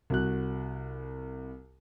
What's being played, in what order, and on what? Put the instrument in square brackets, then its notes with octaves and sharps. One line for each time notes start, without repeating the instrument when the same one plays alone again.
[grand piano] C2 F#4 F#6